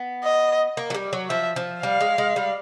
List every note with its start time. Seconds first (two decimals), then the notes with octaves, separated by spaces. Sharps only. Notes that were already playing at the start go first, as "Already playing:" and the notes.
Already playing: B3
0.23 D#5
0.77 A#3
0.90 F#3
0.94 G3
1.13 F#3
1.30 F3 E5
1.56 F3
1.83 G3 F5
2.01 G#3
2.18 G#3
2.36 G3